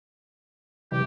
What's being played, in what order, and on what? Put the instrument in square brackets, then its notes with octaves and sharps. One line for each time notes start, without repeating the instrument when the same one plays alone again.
[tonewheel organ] C3 E3 G3 [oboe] G4